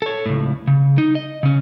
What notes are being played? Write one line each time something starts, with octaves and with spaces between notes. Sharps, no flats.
A4 C#5
C#2 A2
C#3
D#4
D#5
C#3 C#4